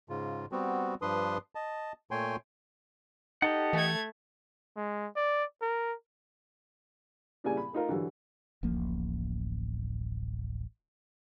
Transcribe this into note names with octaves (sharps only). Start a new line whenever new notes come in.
G#2 C#3 F4
G3 B3 C4 F#4
G2 F3 D4 B4 C6 D#6
D#5 A5
A#2 A3 C#5 G5 G#5 C6
D#4 G4 A4 D#5 F#5
E3 A3 G#6
G#3
D5
A#4
A#2 C#3 G3 E4 D5 G#5
B5
A3 D#4 F4 A#4
D3 E3 F#3 G3
D1 A1 F3 A#3